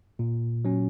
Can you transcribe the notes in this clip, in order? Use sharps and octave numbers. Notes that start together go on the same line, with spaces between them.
A#2
F#3 C#4